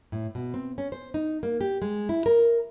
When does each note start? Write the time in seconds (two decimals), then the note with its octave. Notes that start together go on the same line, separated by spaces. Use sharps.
0.12 A2
0.35 B2
0.54 C4
0.78 C#4
0.92 C5
1.14 D#4
1.43 A#3
1.61 G4
1.82 G#3
2.09 E4
2.26 A#4